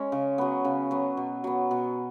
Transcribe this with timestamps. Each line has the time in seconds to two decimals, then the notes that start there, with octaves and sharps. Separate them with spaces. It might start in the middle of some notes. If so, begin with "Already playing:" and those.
Already playing: G#3 C#4
0.12 C#3
0.38 F#3 B3
0.65 C#3
0.91 F#3 B3
1.17 B2
1.44 F#3 B3
1.71 B2